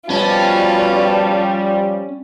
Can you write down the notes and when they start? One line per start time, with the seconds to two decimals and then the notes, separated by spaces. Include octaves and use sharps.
0.10 B2 F3 G3 C#4 F4 A5